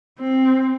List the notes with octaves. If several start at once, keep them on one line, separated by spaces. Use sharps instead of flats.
C4